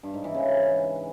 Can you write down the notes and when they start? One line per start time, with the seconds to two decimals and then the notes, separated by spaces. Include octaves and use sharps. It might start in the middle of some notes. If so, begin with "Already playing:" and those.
0.03 G2
0.14 G#2
0.24 E3
0.35 C#3